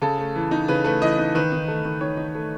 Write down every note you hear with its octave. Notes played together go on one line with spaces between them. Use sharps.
C#3 A4
A3
E3
D#4
C#3 B4
A3 B4
E3 D#5
D#4
D#3 B4
D#4
A3
D#3
D#3 C#5
D#4
A3